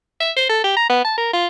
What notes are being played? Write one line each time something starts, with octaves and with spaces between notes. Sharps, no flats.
E5
C5
A4
G4
A#5
B3
A5
A#4
F4